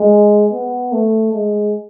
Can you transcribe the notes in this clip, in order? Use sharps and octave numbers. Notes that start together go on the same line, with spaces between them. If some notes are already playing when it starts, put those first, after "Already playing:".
Already playing: G#3
B3
A3
G#3